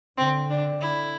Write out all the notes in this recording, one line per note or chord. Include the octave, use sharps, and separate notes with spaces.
D3 C4
D3 D4
D3 E4